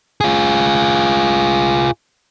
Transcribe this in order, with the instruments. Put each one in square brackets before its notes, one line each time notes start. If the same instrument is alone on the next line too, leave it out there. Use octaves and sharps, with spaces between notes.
[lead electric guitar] F4 G#4